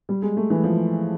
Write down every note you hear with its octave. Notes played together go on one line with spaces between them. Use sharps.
G3
G#3
A3
E3
F3